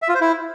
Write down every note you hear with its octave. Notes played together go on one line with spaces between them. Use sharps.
E5
F4
C5
E4